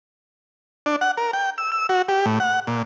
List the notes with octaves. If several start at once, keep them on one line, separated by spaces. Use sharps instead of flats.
D4
F#5
A#4
G5
E6
E6
F#4
G4
A2
F#5
A#2